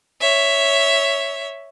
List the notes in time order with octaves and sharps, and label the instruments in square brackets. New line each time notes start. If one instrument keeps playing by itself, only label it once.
[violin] C#5 E5